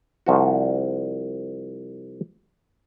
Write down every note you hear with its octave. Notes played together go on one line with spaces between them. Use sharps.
C2 F3 F#4